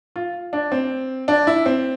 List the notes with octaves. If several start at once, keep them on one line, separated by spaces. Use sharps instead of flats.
F4
D4
C4
D4
E4
C4